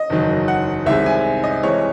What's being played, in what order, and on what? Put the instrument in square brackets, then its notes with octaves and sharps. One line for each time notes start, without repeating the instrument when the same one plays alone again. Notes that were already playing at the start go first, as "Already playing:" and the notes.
Already playing: [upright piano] D#5
F#1 E2 D#3 F#3
F#5
C2 C3 D#3 G#3 E5
G#5
D#5
C2 C3 E3 G#3 C#5